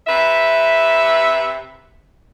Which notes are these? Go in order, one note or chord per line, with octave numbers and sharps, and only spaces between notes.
C3 B4 E5